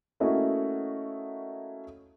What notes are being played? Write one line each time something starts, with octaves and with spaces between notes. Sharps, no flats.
A3 A#3 C#4 E4 F#4 D#5